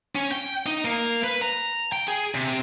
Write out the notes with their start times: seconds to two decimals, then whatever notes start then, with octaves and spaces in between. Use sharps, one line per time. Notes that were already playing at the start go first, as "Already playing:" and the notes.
0.15 C#4
0.32 G5
0.66 D#4
0.85 A#3
1.24 B4
1.42 A#5
1.92 G5
2.08 G#4
2.35 C3